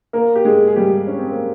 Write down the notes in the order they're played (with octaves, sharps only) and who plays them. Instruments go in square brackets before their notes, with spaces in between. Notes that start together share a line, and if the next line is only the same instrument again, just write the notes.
[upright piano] A#3 A#4
G4
G#3 G#4
G#4
G3 G4
C#4
C4
A#3